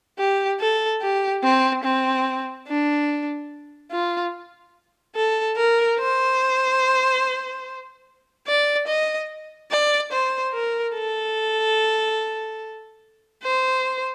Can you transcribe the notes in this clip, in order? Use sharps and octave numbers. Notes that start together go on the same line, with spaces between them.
G4
A4
G4
C4
C4
D4
F4
A4
A#4
C5
D5
D#5
D5
C5
A#4
A4
C5